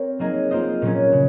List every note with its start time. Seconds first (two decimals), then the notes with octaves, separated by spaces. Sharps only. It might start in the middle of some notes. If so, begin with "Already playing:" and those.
Already playing: C4 A#4 C#5
0.19 F#3 A#3 D#4 G#4 D#5
0.51 A#3 F4 C5 D#5
0.82 A#2 F#3 C#4
1.12 C#3